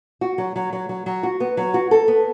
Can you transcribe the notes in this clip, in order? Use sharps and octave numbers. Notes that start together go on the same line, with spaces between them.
F#4
F#3
F#3
F#3
F#3
F#3
F#4
B3
F#3
F#4
A4
B3